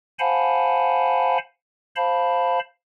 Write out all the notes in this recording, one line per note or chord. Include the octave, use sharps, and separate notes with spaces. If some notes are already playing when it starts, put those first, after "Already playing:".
C5 F5 F#5 G#5 A5 B5
C5 F5 A5 B5